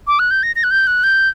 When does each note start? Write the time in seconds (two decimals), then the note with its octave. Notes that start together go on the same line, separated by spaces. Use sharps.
0.07 D6
0.19 F#6
0.31 G6
0.43 A#6
0.56 A#6
0.64 F#6
0.71 G6
0.87 F#6
1.04 G6